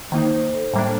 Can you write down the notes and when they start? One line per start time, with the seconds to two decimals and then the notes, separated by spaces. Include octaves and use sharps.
0.12 D#3 A#3 D#4 C5
0.33 C5
0.54 A4
0.74 A2 G3 A#3 D4